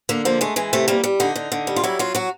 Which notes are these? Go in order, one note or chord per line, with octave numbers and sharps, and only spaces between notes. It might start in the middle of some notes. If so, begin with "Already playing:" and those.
D3 A#3
F3 A#3
G#3 A3
E3 G#3
C3 A3
G3 A#3
G3
D3 D#4
D3
D3
G3
F4
F#3 E4
F#3 F4
F#3 F#4